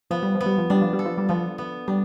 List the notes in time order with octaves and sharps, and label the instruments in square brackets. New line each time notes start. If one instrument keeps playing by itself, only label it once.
[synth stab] F3 [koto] B3
[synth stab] G3
F3
[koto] B3
[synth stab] G3
F3
[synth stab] G3 [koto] D4
[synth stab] F3
G3
[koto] A4
[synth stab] F3
G3
[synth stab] F3 [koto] B3
[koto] B3
[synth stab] G3 [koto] D4